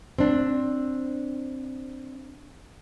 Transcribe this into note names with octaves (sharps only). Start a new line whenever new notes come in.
C4 D4